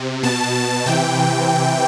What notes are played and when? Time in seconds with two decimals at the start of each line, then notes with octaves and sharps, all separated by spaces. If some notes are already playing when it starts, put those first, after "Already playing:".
Already playing: C3
0.23 B2 A5
0.55 A5
0.86 C3 E3 G5